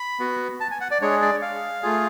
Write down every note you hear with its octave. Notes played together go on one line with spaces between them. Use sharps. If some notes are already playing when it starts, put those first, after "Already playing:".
Already playing: B5
B3 F#4
A5
G#5
F#5
D5
G#3 D4 G#4 C#5
D5
F5
A3 F4 G#4